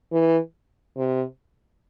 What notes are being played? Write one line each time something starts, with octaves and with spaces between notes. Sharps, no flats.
E3
C3